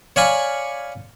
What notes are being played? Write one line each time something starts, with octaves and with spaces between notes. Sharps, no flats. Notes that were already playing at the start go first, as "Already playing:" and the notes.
C#5 D5 F5 G#5 B5 C#6